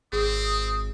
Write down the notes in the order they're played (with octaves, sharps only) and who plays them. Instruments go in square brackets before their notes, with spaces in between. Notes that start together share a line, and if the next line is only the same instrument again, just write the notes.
[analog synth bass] G#1 [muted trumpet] C4 [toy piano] G#4 [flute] D#6